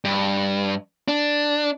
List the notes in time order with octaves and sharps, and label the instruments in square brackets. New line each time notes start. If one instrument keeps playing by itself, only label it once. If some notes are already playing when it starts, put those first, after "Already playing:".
[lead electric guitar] G2
D4